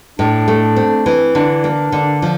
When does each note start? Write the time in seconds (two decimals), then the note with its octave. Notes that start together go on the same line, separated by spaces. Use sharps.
0.19 A2 D4
0.48 A3
0.76 C4
1.06 E3
1.35 D3 D4
1.64 A#3
1.92 D3
2.22 F3